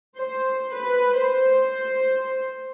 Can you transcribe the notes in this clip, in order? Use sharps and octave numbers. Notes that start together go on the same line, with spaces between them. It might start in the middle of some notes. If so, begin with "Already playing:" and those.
C5
B4
C5